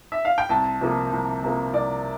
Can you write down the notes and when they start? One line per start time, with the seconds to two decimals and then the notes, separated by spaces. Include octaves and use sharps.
0.12 E5
0.25 F5
0.38 G5
0.49 C2 A5
0.81 C3 F3 A#3
1.12 C2
1.43 C3 F3 A#3
1.73 C2 D5